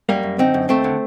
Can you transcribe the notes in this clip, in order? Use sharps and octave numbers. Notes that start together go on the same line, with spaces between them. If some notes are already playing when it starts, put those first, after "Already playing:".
F#2 G3 A#3
F#2
D3 C4 D#4
F#2
D#2 A3 C4
D3